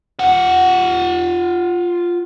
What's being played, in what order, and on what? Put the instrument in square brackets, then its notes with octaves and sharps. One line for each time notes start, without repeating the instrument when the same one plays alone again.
[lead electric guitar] F4 F#5